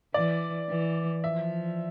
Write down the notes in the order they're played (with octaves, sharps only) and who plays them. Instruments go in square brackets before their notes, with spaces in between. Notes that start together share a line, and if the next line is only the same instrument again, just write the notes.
[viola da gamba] E3 [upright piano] D5
[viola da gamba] E3
[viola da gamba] F3 [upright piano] E5